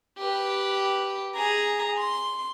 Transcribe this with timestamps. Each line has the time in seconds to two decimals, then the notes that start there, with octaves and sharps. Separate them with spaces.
0.18 G4 B4
1.35 G#4 A#5
1.98 C6